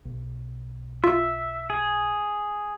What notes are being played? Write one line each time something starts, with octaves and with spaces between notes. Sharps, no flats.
B1
F4 E5
G#4